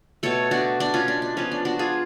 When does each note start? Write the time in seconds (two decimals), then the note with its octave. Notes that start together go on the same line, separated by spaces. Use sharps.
0.23 B2 A3 A4 C#5
0.51 D4 F#4
0.80 D4
0.94 C#4 F4
1.08 D4
1.22 D4
1.37 F3 B3 C#4
1.51 D4
1.65 D4 F#4
1.79 F4 G#4